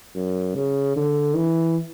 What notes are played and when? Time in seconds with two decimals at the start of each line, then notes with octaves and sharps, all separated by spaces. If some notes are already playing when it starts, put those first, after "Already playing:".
0.16 F#2
0.55 C#3
0.96 D3
1.35 E3